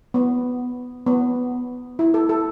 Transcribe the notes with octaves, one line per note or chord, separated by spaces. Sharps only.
B3
B3
E4
A4
A4